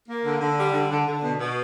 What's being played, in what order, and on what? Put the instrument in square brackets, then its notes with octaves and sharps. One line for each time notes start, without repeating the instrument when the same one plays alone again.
[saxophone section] A#3
D3
D3
G3
D3
D3
D3
B2
B2